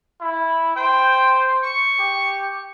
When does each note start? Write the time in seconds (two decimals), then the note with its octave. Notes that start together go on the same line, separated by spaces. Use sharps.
0.21 E4
0.76 C5 G5
1.63 C#6
1.99 G4